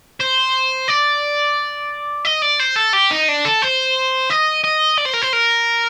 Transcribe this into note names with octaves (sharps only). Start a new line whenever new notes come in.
C5
D5
D#5
D5
C5
A4
G4
D#4
D4
A4
C5
D#5
D#5
D5
C5
A#4
C5
A#4